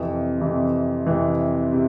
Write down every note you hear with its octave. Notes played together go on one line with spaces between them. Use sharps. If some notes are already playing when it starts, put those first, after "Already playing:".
Already playing: F2 C3 E3
F2 C3 E3
F2 C3 E3
C3